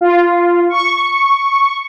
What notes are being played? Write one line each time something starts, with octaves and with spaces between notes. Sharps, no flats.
F4
C#6